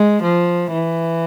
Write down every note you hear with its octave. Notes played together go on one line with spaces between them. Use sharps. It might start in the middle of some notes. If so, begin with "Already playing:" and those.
Already playing: G#3
F3
E3